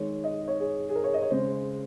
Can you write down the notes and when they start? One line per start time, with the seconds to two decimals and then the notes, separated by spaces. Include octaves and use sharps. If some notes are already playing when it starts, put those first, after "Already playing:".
Already playing: D#3 G#3 C#5
0.24 D#5
0.48 C#5
0.60 G#4
0.89 G#4
0.95 A#4
1.04 C#5
1.14 D#5
1.22 C#5
1.30 C#3 G#3 C5